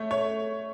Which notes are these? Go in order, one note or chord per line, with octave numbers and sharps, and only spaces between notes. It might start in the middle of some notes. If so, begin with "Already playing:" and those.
Already playing: A3 C#5
C#5